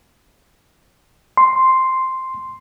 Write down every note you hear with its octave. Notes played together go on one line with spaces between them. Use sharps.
C6